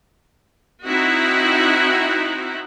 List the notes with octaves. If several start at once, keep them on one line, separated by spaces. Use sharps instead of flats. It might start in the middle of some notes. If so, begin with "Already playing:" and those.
C4 D#4 E4 F#4 E5 F#5